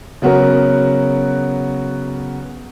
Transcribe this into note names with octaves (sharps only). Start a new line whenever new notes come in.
C#3 F#3 B3 F#4 A#4